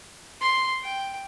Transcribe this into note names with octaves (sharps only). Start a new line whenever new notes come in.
C6
G5